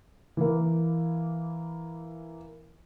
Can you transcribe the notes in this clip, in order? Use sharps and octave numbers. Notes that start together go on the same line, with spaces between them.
E3 A#3